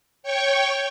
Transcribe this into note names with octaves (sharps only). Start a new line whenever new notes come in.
C#5 G5 C#6